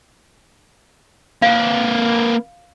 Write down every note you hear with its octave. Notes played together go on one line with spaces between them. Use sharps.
A#3 B4 F5